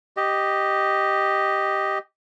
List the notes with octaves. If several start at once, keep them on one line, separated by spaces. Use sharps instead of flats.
G4 D#5